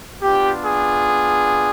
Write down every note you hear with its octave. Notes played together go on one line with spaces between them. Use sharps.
B3 D4 F4 G4
G#4